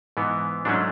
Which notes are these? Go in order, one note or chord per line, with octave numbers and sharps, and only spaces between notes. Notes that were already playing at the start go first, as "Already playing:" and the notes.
G#2 E3 B3
G#2 F#3 A3 C#4 D4